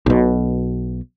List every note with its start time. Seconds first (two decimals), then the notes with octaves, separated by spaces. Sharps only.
0.06 B1 B2